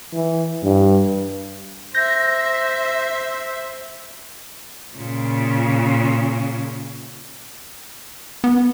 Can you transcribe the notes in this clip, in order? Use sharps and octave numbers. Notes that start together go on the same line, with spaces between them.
E3
G2
C5 E5 G6 A#6
A#2 C#3
B3